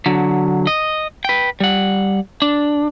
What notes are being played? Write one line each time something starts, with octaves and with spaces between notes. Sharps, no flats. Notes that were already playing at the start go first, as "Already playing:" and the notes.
D3 F#3
D#5
B4 G5
G3 F#5
D4